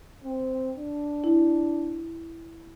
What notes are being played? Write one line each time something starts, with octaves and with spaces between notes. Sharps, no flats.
C4
D4
E4